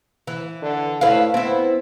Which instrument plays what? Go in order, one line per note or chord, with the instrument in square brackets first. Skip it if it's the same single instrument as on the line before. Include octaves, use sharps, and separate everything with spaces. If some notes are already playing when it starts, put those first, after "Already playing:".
[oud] E3
[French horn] D3
[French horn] A2 [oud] E4 B4 F5
[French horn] B3 [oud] C4 E4